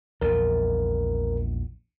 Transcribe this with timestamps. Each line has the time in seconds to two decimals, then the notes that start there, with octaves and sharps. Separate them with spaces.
0.21 A#1 E2 A#2 A#4